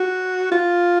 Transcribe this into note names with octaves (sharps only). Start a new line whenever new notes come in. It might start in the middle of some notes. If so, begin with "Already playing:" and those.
Already playing: F#4
F4